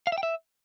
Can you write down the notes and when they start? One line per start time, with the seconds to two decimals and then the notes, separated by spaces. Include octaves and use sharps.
0.07 F5
0.12 E5
0.18 G5
0.23 E5